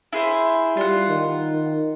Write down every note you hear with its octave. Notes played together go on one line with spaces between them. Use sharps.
E4 G#4 C5
G3 F4 F#5
D#3